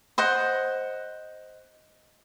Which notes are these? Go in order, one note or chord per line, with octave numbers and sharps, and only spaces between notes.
C5 D#5 F#5